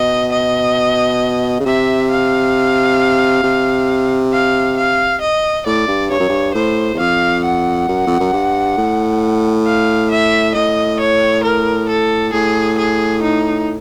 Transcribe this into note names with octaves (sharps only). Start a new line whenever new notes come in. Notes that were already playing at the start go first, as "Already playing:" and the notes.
Already playing: B2 D#5
D#5
C#3
C3 E5
F5
C3
F5
F5
D#5
A2 D5
G2
G2 C#5
F#2
G2
A2 C5
E2
F2 F5
F#5
F#2
F2
F#2
G2
A2
F5
E5
A2 D#5
C#5
A#4
A4
A2 G#4
G#4
D#4